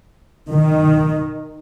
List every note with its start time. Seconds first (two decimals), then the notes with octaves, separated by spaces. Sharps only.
0.50 D#3